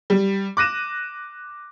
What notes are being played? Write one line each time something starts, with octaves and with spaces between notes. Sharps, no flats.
G3
D6 F#6 A#6 D#7 E7